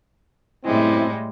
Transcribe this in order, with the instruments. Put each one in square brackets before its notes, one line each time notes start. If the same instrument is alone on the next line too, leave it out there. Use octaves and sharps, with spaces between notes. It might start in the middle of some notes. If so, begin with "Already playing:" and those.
[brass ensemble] F#1 C4 E4 [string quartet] A2 G3 G#3